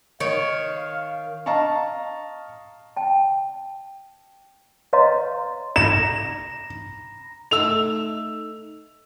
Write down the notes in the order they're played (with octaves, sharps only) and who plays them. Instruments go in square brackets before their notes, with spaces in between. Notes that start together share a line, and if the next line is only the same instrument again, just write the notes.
[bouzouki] D#3 [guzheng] C#5 [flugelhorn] F5
[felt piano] D#5 F5 A5 A#5 C#6
[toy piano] G5 A5
B4 C#5 D#5 F5 A#5 C6
[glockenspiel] A#5 B5 A#6 [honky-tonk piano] E7
[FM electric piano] A3 D#4 [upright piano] E6 F7